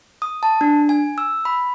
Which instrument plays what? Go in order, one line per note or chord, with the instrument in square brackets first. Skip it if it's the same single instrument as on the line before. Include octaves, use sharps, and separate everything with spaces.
[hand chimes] D#6
A5
D4
G#5
E6
B5